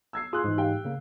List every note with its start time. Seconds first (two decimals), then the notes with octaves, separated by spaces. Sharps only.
0.13 E6 G#6 C7
0.33 F4 G#4 C6 E6 F#6
0.44 G#2 E3
0.57 G4 F5 G5
0.85 C#3 A#3